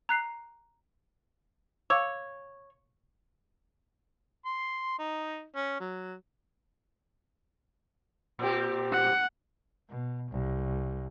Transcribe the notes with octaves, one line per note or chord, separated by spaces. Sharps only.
A#5 F#6 C7
C#5 F5 D6 E6
C6
D#4
C#4
F#3
A#2 C4 G4
F#5
B2
C2